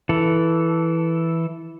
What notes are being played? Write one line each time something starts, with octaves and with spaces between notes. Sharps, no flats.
E3 A4